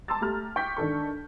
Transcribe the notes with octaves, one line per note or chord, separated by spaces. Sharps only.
A5 A#5 C6 D6 E6 A6
A3 G4 A#5 F6
G5 C#6 D6 G6 B6
D#3 D4 A4 C#6